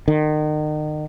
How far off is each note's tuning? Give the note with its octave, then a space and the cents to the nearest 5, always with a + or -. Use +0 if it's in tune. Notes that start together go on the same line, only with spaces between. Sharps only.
D#3 -35